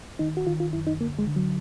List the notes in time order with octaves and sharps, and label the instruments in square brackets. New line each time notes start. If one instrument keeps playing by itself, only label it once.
[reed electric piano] D#3 D#4
F#4
D#3 F4
F4
F#2 E4
D#4
D3 A#3
G#3
D3
F#3